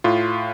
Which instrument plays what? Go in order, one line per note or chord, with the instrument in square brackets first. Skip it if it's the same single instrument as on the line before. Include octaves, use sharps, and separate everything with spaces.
[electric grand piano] A2 F4